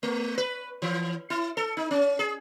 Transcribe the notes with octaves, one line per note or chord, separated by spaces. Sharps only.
A3
B4
E3
E4
A4
D#4
C#4
G#4